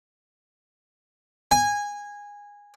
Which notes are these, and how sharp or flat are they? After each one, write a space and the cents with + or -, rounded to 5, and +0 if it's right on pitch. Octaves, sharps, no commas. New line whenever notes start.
G#5 -15